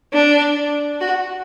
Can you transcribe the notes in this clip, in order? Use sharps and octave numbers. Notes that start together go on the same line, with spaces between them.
D4
F#4